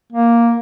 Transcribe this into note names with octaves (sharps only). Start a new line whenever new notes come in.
A#3